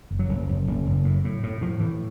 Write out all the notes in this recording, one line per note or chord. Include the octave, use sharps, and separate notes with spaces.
F#1
F#3
F#1
F#1
F#1
F#1
A2
A2
A2
A2 F3
A2 E3